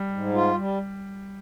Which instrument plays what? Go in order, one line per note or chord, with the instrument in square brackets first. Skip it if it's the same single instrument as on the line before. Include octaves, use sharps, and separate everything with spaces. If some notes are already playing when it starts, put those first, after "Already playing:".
Already playing: [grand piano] G3
[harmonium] G#2
F4
G3